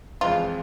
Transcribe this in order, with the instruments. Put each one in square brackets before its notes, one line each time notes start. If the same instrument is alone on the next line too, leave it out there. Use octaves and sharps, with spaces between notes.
[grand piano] F2 E3 G#3 C4 [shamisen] F4